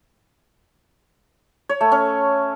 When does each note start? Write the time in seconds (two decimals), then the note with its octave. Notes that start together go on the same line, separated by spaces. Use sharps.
1.69 C#5
1.81 A3
1.92 C#4